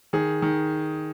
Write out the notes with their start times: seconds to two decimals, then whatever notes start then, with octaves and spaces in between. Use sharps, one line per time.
0.13 D#3 G#4
0.42 D#3